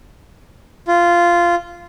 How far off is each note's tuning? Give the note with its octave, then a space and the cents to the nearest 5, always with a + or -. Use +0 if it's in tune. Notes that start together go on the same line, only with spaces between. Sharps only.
F4 -10